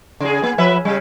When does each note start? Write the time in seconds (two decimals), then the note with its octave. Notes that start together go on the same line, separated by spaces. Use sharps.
0.20 C#3 G#4
0.43 A#3
0.58 F3 B4 E5
0.85 C#3 G3